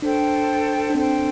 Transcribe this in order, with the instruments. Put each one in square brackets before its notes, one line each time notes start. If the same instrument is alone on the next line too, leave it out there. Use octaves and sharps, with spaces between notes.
[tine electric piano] D4 [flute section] A4 C5 G5
[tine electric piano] D4
[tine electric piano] C4 [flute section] A4 C5 G5